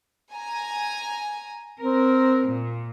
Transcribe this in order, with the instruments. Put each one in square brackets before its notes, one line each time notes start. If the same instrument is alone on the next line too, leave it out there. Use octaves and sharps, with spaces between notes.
[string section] G#5 A#5
[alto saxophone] C4 [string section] A#4
[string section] A#2